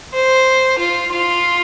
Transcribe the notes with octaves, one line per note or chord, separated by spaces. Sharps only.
C5
F4
F4